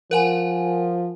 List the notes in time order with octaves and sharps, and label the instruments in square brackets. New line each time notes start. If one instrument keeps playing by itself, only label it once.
[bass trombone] F3 [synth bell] A#4 F#5 G#5